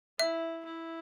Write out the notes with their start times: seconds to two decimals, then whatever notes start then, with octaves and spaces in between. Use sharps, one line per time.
0.19 E4 E5
0.65 E4